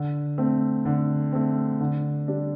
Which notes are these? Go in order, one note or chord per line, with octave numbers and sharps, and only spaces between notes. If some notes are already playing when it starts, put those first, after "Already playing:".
Already playing: D3
A3 C4
D3
A3 C4
D3
G3 D4